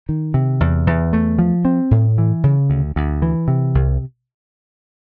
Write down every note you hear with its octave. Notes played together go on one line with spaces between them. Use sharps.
D#3
C3
E2
E2
A3
F3
C4
A2
E3
C#3
D2
D2
E3
C3
C2